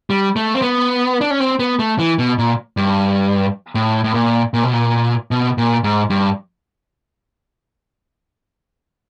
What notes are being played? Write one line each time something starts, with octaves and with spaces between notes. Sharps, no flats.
G3
A3
C4
B3
D4
C#4
C4
B3
A3
E3
B2
A#2
G2
A2
A2
A#2
A#2
B2
A#2
B2
A#2
G#2
G2